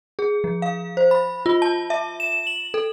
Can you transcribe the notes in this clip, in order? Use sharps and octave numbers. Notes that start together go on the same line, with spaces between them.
G#4
F3
F5
C5
B5
F4
A5
E5
E7
F#7
A4